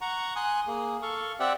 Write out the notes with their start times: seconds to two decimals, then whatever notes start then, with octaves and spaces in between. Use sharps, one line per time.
0.01 F#5 A#5 C#6
0.36 G#5 C6 D#6 F#6
0.67 A#3 G#4
1.02 A4 F5 C#6
1.40 C4 G4 D5 E5 F#5 G5